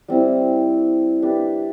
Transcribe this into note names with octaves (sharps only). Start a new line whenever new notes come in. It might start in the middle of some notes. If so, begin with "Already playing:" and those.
G3 C4 E4
D4 G4 B4 E5